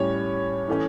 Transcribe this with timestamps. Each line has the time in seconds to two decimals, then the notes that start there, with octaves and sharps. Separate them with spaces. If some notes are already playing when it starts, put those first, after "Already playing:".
Already playing: A2 G3 C#4 C#5
0.68 E3 A3 C#4